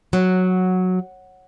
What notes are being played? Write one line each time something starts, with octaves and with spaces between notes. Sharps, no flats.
F#3